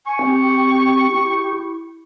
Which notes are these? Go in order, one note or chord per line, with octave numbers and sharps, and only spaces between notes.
G#5 C#6
C4 G4
E4